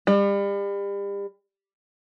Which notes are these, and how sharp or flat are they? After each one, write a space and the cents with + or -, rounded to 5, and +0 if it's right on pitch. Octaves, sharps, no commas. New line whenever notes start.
G3 +35